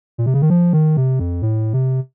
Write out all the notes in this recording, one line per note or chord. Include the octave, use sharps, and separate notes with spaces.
A#2
C3
C#3
D#3
F3
D#3
C3
F2
A2
C3